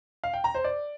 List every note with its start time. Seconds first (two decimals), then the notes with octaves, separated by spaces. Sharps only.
0.24 F5
0.34 G5
0.44 A#5
0.55 C5
0.64 D5